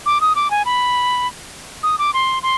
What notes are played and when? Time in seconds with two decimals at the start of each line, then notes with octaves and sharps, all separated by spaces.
0.06 D6
0.21 D#6
0.35 D6
0.51 G#5
0.65 B5
1.83 D#6
1.99 D6
2.14 C6
2.43 C6